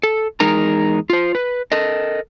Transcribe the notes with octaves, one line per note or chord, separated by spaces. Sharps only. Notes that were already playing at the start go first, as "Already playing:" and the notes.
A4
E2 G#3 D#4 A#4 A#5
F4 C5
B4
A4 A#4 D#5